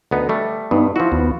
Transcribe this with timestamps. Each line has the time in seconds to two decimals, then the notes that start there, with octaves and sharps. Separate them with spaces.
0.11 D2 B3 D#4
0.29 G3 A3
0.71 G2 B3 D#4
0.96 F3 E4 F#4
1.12 D#2 B3